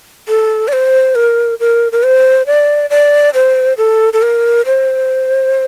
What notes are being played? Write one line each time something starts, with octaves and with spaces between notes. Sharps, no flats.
A4
D5
C5
A#4
A#4
A#4
C5
D5
D5
C5
A4
A4
A#4
C5